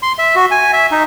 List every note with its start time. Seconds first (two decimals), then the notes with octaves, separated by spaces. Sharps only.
0.03 C6
0.19 E5
0.36 F#4
0.51 G#5
0.73 E5
0.91 D#4